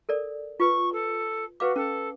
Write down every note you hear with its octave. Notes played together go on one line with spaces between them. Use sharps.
A4 A#4 D5
F4 B4 C#6
A4
F#4 B4 F5 D6
C#4 A4